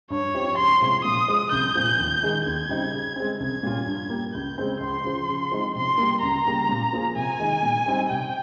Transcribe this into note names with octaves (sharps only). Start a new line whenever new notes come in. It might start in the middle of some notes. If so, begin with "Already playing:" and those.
G2 C#5
F3 C4 D#4 G4
C#2 C6
C3 F3 G#3
A#2 D#6
F3 G#3
C2 G6
A#2 F3
D#2
D#3 G#3 D#4 G#4
D#2 G#6
C#3 G3 C4 D#4
C#3
G#3 C4
C2 G#6
A#2 G3 C#4 F4
G2
G3 A#3
C#2 G6
C#3 G#3 C4
C#2 C6
C#3 F3
C#3
F3 G#3 C4 D#4
C3 C6
G3 A#3
C#2 A#5
C#3 G3 A#3
A#2
F3 A#3 F4 G#4
C3 G#5
D#3 G#3 D#4
A#2
G3 C4 D#4
C3 G5